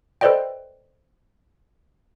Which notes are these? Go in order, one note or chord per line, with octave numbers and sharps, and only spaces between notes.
A4 B4 C5 D5 D#5 G5